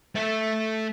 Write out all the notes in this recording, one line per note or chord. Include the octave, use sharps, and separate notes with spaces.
A3 E5